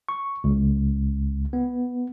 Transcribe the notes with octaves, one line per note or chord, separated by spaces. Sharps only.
C#6
C#2
B3